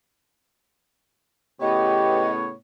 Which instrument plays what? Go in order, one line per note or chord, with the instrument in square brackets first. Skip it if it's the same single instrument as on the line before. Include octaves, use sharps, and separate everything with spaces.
[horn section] A2 C#3 B3 [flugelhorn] G4 [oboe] C#5 [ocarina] D#5